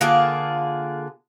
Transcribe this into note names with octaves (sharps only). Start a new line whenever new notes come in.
D3 A#3 F4 G#4